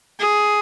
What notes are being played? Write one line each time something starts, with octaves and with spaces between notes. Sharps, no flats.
G#4